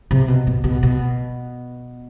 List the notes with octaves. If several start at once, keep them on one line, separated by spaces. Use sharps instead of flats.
C3
B2
B2
B2
B2